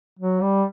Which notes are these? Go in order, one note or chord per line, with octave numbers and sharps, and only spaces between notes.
F#3
G3